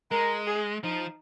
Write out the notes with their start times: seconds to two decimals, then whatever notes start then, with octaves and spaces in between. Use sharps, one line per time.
0.11 G#3 A#4
0.47 G#4
0.84 F3 D#4